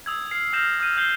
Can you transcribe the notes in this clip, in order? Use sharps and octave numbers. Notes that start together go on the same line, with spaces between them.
D#6 E6 G#6
F6 C7
E6 F6 G6 A#6 E7 F7
D#6 F6 G6 D#7
E6 G6 C7 G7